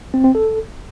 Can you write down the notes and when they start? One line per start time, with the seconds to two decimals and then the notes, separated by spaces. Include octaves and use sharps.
0.14 C4
0.24 C4
0.35 A4